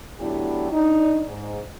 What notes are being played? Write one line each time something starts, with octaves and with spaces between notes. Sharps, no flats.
A2 F#3 B3 D4 E4 G4
D4 D#4
G#2